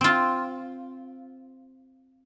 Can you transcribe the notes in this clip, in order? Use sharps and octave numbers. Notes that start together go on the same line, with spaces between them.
C4 F4